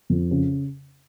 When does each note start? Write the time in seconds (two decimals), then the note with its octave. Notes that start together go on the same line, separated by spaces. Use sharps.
0.10 F2
0.31 C#3